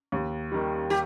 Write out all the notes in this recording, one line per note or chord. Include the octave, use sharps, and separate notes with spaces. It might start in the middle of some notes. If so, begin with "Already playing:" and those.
D#2
D#3 G3
G4